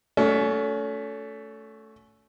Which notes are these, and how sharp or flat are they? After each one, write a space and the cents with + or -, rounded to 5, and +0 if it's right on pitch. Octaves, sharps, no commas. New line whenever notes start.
A3 +0 C#4 +35 F#4 +0